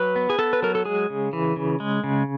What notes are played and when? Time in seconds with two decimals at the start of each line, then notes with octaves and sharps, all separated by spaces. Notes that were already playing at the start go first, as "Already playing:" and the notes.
Already playing: F#3 B4
0.16 B3
0.30 G#4
0.39 B3 A4
0.53 B4
0.62 F#3 A#4
0.75 A4
0.85 G#3 G#4
1.10 C#3
1.33 E3
1.56 C#3
1.80 G#3
2.04 C#3